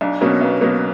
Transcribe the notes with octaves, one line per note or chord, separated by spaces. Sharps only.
B1 D4
B2 F#3 A#3 C#4
B1 B3
B2 F#3 A#3